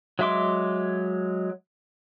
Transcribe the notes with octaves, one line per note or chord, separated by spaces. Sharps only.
F#3 G#3 E5 C6 D6